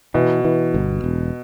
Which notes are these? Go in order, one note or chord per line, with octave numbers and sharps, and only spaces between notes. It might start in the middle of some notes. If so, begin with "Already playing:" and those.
B2 E3
E3
G1
E1